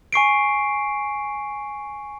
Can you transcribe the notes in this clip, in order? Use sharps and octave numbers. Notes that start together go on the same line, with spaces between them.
G#5 C#6 C7 D7